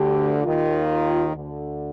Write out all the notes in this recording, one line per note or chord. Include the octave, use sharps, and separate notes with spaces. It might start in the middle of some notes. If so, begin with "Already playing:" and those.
Already playing: D2 D3 G4
D#2 D#3 F4
D2 D3